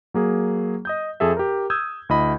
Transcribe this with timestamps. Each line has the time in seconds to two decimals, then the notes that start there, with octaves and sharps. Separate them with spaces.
0.14 F#3 A#3 G#4
0.85 D#5 D#6 G6
1.20 F2 G#4 A4 E5
1.37 G4 A#4
1.70 D#6 E6 G6 G#6
2.09 D2 E4 D#5 B5